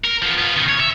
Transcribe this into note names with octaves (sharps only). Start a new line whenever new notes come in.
A#4
F3 B3
B3 F4
B2 D#3
C#5
E5